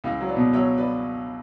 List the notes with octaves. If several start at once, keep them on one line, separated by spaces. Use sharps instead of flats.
C#2 C#4 E4
F#3
B4 D5
B2
F#3 C#5 E5
B4 D5